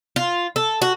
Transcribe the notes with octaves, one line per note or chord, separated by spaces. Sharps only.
F4
A4
F#4